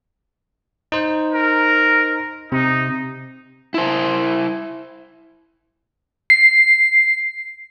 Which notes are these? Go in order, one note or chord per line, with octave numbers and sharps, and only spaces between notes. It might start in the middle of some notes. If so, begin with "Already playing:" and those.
D#4 C5
A#4
C3 D#4
E4 C5
C7